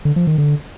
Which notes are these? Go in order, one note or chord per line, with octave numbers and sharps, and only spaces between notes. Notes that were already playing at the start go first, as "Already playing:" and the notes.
D3
F3
D#3
D3